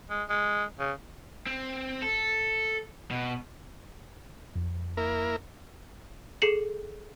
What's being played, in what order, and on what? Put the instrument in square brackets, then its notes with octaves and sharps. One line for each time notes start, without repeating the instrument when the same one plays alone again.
[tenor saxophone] G#3
G#3
C#3
[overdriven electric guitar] C4
A4
B2
[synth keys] F2
[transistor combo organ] A#3 E4 A#4
[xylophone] G#4 A4 C7 C#7 E7 F#7